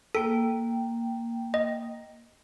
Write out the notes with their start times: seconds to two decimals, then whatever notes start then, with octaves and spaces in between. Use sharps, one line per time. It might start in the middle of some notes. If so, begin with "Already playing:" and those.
0.15 A#3 A4 G5
1.54 D#5